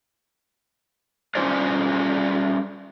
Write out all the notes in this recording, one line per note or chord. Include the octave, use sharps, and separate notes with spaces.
G3 C#4 F4 G#4 C5 D5